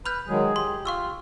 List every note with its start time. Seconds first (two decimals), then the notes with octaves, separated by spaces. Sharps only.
0.06 B4 B5 F6 G6
0.29 D#3 F#3 G#3 G#4
0.56 G4 C6
0.85 F4 F5 C#6 E6